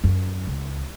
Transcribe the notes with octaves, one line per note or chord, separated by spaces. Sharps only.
F#2
C#2